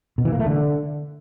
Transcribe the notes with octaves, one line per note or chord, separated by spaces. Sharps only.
B2
E3
A#3
A3
D3